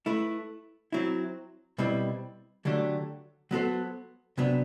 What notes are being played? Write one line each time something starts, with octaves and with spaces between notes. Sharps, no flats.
A3 E4 B4
F#3 C4 E4
B2 G3 C4 E4
D3 F#3 A3 D4 G4
F#3 B3 F#4 A4 C5
C3 F#3 B3 D4